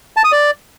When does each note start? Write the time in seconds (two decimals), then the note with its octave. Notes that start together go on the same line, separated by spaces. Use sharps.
0.17 A5
0.24 D#6
0.32 D5